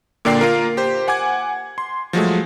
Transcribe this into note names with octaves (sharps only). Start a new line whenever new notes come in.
A#2 D3 A#3 D5 G5 C7
A#3 F4 A#4
G4 C5
F#5 G#5 D6 G#6
C6
F3 F#3 G#3 A3